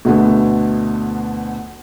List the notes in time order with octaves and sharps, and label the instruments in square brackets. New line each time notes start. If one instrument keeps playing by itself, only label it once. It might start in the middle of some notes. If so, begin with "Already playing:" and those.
[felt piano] D2 B2 D3 A3 B3